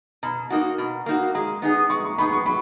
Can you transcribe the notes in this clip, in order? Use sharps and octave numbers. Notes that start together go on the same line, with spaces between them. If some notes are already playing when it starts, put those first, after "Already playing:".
B2 A#5
A#3 D#4 F#4
B2
A#3 D#4 F#4
G#3 A#5
B3 D#4 G#4
G#3 C#6
C#6
B3 D#4 G#4 B5
C#6
F#3 B5